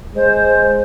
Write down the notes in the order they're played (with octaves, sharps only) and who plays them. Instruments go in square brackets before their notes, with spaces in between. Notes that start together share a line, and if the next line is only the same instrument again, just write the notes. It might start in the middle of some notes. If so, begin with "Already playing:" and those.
[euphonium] G#3 [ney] C5